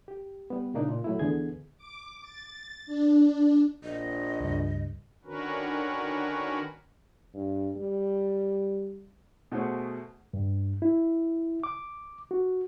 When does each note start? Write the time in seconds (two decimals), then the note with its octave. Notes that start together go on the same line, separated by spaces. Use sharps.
0.08 G4
0.50 G3 B3
0.74 A#2 C#3 A#3 D4 D#4
0.89 A#2
1.04 F#3 A3 E4
1.19 D2 D3 E3 B3 G#4 G#6
1.77 D6
2.21 A6
2.86 D4
3.83 A#1 D#5
4.40 C#2 G2
5.25 D3 D#3 C#4 F#4 A#4 B4
7.34 G2
7.76 G3
9.52 B2 A3 F#4 G#4 C5
10.34 G2
10.82 E4
11.63 D6
12.31 F#4